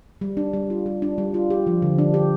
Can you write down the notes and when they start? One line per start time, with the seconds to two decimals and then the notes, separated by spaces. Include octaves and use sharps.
0.21 G3
0.37 D4
0.53 G3
0.70 F4
0.86 G3
1.02 D4
1.18 G3
1.34 F4
1.50 G4
1.67 F3
1.82 D3
1.98 D4
2.14 G4